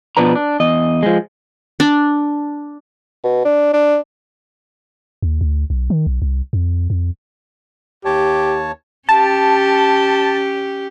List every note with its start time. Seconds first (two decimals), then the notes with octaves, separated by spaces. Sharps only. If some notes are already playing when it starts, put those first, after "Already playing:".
0.17 B2 F3 D4 B4 A#5
0.35 D4
0.60 E2 D#5
1.03 F3 G#3
1.80 D4
3.24 B2
3.45 D4
3.73 D4
5.22 D#2
5.41 D2
5.70 B1
5.90 D#3
6.07 B1
6.22 C2
6.53 F2
6.90 F2
8.05 D#2 G4 C#5 A5
9.09 C#4 G4 A5